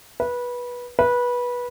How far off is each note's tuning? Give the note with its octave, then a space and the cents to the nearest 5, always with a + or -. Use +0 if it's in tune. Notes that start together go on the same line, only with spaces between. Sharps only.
B4 -20
B4 -20